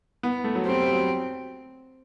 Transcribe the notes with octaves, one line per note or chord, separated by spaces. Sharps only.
B3
A3
F#3
G3 C4
G3
F#3